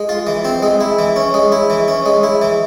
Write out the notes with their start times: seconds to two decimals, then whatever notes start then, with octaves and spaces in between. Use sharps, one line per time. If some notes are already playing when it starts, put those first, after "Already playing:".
Already playing: G#3
0.09 F4
0.27 E3
0.45 C4
0.63 G#3
0.80 E4
0.99 E3
1.16 C#4
1.34 G#3
1.52 E4
1.70 E3
1.88 C#4
2.06 G#3
2.24 E4
2.42 E3